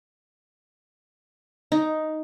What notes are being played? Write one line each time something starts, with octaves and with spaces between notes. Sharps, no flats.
D#4